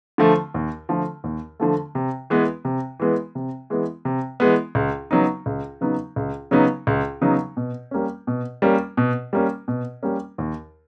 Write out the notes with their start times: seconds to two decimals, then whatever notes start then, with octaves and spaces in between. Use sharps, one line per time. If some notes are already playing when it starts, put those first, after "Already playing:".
0.18 D3 F3 A3
0.54 D#2
0.89 D3 F3 A3
1.24 D#2
1.60 D3 F3 A3
1.95 C3
2.30 E3 G#3 B3
2.65 C3
3.00 E3 G#3 B3
3.35 C3
3.70 E3 G#3 B3
4.05 C3
4.40 E3 G#3 B3
4.75 C#2
5.11 C#3 F#3 B3 D#4
5.46 C#2
5.81 C#3 F#3 B3 D#4
6.16 C#2
6.51 C#3 F#3 B3 D#4
6.87 C#2
7.21 C#3 F#3 B3 D#4
7.57 B2
7.91 G3 A#3 C#4
8.27 B2
8.62 G3 A#3 C#4
8.97 B2
9.33 G3 A#3 C#4
9.68 B2
10.03 G3 A#3 C#4
10.38 D#2